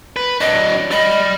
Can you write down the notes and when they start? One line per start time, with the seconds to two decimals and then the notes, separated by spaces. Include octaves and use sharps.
0.16 B4
0.41 F#3 D4 D#5
0.91 D5 D#5 B5